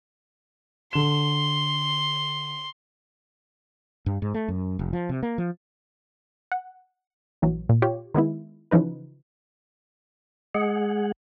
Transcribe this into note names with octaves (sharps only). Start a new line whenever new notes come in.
D3 C6 E7
G2
G#2
A3
F#2
F1
F3
C3
A#3
F3
F#5
A#1 E3 F#3
A#2
F4 G4 C#5
D#3 G#3 B3 E4
C#3 E3 F3 D#4 B4
G#3 G#4 F#5